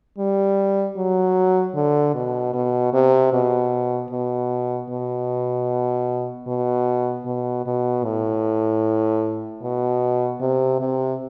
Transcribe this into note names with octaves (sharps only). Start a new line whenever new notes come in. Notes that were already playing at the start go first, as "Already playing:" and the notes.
G3
F#3
D3
B2
B2
C3
B2
B2
B2
B2
B2
B2
A2
B2
C3
C3